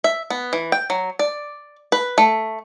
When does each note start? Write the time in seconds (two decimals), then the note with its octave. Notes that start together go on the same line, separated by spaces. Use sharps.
0.04 E5
0.30 B3
0.53 E3
0.72 G5
0.90 F#3
1.19 D5
1.92 B4
2.18 A3